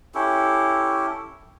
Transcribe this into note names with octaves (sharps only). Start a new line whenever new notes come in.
C#4 E4 G4 A4